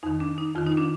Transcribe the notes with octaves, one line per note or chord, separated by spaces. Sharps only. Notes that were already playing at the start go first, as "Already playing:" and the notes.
F2 D#3 D#4
D4
D#4
F2 D#3 F4
D#4
D4